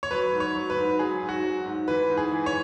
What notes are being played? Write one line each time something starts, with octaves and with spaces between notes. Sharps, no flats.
C#5
F#3 B4
G#2
C#5
F#3
B4
G#2
F#3 G#4
G#2
F#4
F#3
G#2
E3 B4
G#2
G#4
E3
C#5